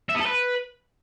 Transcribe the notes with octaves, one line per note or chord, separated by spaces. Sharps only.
E5
B3
A4
B4